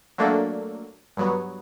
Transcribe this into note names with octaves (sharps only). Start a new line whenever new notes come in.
F#3 A3 A#3 D4 A4
G2 F#3 B3